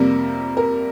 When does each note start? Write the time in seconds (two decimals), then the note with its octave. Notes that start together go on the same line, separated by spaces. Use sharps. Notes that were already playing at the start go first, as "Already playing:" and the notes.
Already playing: F2 C3 G3 A#3 A#4
0.57 A#4